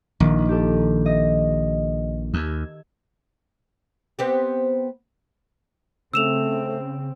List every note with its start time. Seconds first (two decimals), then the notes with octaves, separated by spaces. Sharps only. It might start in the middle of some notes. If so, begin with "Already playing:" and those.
0.20 A#1 D#3
0.49 G4 A4
1.06 D#5
2.34 D#2 E6 G#6
4.19 B3 C4 G4
6.13 C#3 A3 C4 E6 E7 F7